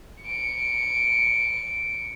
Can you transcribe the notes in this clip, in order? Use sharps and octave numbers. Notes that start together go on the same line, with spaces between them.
C#7 D7